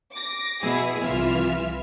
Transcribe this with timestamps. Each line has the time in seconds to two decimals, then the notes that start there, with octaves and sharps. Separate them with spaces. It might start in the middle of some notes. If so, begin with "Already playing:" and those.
0.13 D6 A#6
0.61 B2 E4 G#4
1.03 C2 E3 F4 E5 F6